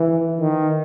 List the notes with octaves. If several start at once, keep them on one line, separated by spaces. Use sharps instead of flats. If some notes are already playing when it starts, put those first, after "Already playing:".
Already playing: E3
D#3